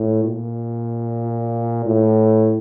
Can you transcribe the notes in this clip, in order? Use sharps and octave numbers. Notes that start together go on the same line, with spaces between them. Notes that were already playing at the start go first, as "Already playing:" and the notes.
Already playing: A2
A#2
A2